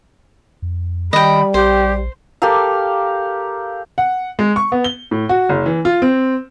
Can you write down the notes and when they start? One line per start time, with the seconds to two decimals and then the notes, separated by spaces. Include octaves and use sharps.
0.62 F2
1.13 D#3 G3 D#5 G5 B5
1.54 A#1 G4 C5
2.42 G4 A4 A#4 F5
3.98 F#5
4.39 G#3
4.56 C#6
4.72 B3
4.84 G7
5.11 A2
5.29 F#4
5.49 F#1
5.66 E3
5.85 F4
6.02 C4